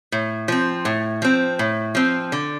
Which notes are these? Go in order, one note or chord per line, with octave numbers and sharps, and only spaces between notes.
A2
F3 C4
A2
F3 C4
A2
F3 C4
D3